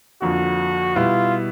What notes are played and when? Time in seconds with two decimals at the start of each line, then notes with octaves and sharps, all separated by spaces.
0.22 F2 D3 F3 A#3 F#4
0.96 B2 G3 B3 E4 F4